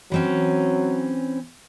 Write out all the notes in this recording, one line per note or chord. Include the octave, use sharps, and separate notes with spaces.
E3 F#3 C4 C#4